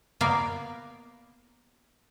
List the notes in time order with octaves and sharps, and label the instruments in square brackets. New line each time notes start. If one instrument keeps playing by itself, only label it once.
[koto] A#3 B3 A#4 D5 F5